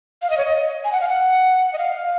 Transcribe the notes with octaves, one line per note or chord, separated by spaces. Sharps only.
F5
D#5
C#5
D#5
G#5
F#5
F5
F#5
D#5
F5